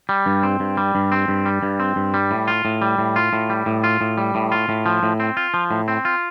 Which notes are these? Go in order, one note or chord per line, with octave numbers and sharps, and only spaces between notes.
G3
G2
C4
G2
G3
G2
C4
G2
G3
G2
C4
G2
G3
A2
F4
A2
G3
A2
F4
A2
G3
A2
F4
A2
G3
A2
F4
A2
F3
A2
C4
F4
F3
A2
C4
F4